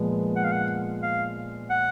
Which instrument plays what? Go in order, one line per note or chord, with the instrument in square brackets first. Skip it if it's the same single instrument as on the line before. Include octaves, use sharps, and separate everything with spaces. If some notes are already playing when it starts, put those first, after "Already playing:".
Already playing: [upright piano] A#2 F3 G#3 B3
[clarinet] F#5
F5
F#5
F5
F#5